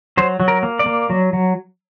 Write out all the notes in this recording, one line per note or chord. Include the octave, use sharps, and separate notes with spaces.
F#3 C5
F#3
A#4
A#3
D5
A#3
F#3
F#3